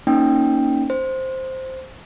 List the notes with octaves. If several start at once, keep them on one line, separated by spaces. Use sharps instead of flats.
A#3 C#4 D#4 G5
C5